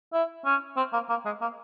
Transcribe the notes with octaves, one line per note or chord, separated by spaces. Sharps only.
E4
C#4
C4
A#3
A#3
G#3
A#3